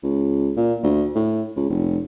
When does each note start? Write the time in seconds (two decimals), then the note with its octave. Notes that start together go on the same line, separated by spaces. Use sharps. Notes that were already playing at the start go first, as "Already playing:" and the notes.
0.03 C#2
0.57 A#2
0.83 D2
1.15 A2
1.56 C#2
1.70 F1